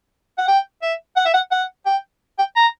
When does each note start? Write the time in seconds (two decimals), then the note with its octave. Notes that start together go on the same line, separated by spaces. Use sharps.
0.38 F#5
0.48 G5
0.82 E5
1.17 F#5
1.26 E5
1.34 F#5
1.52 F#5
1.86 G5
2.39 G5
2.56 A#5